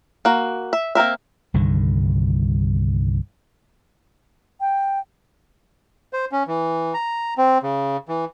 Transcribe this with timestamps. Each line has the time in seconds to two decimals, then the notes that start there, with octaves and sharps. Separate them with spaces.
0.25 A#3 F#4
0.73 E5
0.95 A#3 C4 A#4 E5
1.54 C2 G2 D3 D#3
4.60 G5
6.13 C5
6.32 C#4
6.47 E3
6.94 A#5
7.38 C4
7.63 C#3
8.09 E3